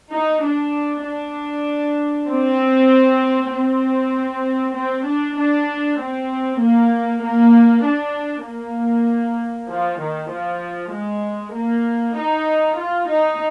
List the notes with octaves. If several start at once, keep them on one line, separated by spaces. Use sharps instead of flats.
D#4
D4
D4
C4
C4
C4
D4
D4
C4
A#3
A#3
D4
A#3
F3
D#3
F3
G#3
A#3
D#4
F4
D#4